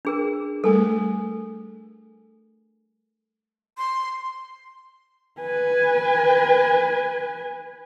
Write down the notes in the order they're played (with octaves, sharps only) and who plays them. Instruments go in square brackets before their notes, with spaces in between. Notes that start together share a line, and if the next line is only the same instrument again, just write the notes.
[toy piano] D4 G#4 A#4
[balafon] G3 A3 [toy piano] A4 A#4 G#5
[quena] C6
[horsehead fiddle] B4 G#5